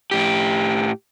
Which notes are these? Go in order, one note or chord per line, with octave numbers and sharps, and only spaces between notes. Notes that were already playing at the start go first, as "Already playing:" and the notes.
A2 G4